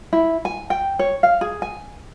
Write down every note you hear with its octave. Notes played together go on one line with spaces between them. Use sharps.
E4
G#5
G5
C#5
F5
G#4
G#5